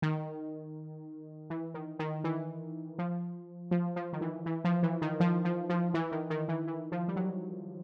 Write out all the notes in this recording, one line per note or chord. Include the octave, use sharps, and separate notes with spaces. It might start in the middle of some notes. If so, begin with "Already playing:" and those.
D#3
E3
D#3
D#3
E3
F3
F3
F3
D#3
E3
E3
F3
E3
D#3
F3
F3
F3
E3
D#3
D#3
E3
E3
F3
G3
F#3